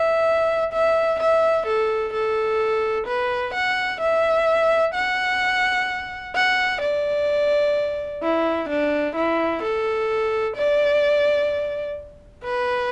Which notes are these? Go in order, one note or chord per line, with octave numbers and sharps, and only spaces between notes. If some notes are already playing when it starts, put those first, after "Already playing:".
Already playing: E5
E5
E5
A4
A4
B4
F#5
E5
F#5
F#5
D5
E4
D4
E4
A4
D5
B4